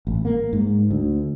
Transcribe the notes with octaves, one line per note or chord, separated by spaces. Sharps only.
A1
A#3
G#2
D2